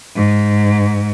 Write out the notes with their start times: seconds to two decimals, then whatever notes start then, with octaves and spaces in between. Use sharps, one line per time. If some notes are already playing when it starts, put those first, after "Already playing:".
0.16 G#2